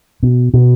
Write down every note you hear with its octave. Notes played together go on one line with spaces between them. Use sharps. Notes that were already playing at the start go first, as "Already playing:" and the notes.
B2
B2